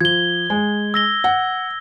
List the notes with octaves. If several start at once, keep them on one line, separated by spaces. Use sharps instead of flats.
F3 G#6 G7
G#3
E6 A#6 G7
F#5